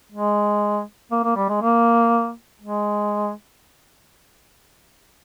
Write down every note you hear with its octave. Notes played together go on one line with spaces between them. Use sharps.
G#3
A#3
A#3
G3
G#3
A#3
G#3